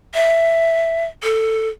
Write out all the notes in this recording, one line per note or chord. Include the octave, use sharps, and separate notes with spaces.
E5
A4